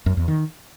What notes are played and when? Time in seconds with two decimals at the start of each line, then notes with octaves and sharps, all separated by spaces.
0.06 F#2
0.17 E2
0.28 D#3